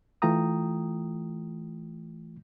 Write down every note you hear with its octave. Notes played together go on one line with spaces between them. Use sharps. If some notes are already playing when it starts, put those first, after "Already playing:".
E3 A3 F4 G5 A#5 D#6